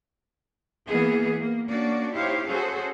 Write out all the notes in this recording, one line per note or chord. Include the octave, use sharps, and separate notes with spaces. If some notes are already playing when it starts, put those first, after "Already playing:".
E3 A#3 B3 G#4
A#3
A#3 C#4 D4 F#4 D5
D#4 E4 G4 C5 C#5 F5
C#4 F#4 G#4 A4 C5